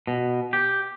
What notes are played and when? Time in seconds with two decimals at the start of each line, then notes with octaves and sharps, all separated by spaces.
0.07 B2
0.53 G4